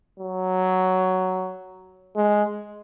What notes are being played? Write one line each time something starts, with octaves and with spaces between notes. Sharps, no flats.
F#3
G#3